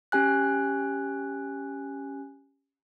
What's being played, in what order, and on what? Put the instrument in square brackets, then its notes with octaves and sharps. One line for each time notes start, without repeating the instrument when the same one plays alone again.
[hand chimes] C#4 G4 G#5 F#6